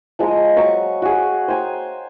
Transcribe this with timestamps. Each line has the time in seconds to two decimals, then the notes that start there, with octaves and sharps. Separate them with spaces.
0.19 F3 G#3 D#5 A#5
0.57 F#3 A#5 C#6
1.02 F#4 G#4
1.48 C5 G5 G#5 A#5